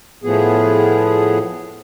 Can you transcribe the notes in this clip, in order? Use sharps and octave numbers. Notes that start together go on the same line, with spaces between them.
A2 F3 B3 G#4